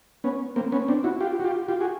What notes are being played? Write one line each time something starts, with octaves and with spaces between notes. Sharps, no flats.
B3 C#4
A#3 C4
B3 C#4
C4 D4
E4 F#4
F4 G4
F#4
F4 G4
F4 G4
F#4 G#4